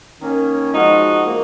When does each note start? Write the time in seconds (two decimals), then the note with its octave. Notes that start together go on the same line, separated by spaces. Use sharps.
0.20 D#3 A#3 C#4
0.73 F3 G#3 D#4 F#4
1.26 A#3